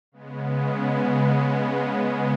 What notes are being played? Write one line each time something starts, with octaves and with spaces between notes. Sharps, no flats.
C#3 G#3 B3